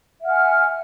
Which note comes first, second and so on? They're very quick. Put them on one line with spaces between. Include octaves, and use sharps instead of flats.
E5 F#5 F6 G#5